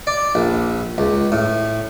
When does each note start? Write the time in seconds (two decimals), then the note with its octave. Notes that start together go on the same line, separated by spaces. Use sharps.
0.07 D5
0.35 A#1
0.98 C#2
1.32 A2